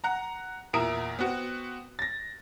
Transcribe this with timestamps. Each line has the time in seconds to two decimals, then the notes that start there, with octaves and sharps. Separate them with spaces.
0.04 F#5 A#5
0.73 E2 A#2 E4 A#4 D#6 D7
1.19 B3 C4 F#4
1.99 A6 A#6